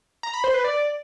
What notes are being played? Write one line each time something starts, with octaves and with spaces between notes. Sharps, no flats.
A#5
B5
C5
B4
D5